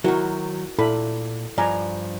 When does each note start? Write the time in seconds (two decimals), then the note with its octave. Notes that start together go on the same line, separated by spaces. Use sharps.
0.04 D#3 F#3 E4 F#4 A#4
0.79 A#2 E4 A4 B5
1.58 G2 F3 D5 G#5 A#5